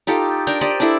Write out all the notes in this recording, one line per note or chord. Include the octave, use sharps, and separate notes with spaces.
D#4 F4 G4 A4
D4 A#4 G5
G4 C5 D5 D#5
D4 E4 A4